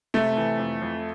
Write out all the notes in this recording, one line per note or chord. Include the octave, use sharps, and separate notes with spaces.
C3 A3
E3
F2
F2